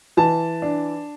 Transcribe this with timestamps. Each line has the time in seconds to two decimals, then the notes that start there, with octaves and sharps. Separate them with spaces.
0.17 E3 A5
0.62 D4